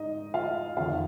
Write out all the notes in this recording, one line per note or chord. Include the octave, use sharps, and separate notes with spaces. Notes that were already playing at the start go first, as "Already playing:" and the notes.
Already playing: G#2 D#4 D#5
F4 F5
F2 D#3 F4 F5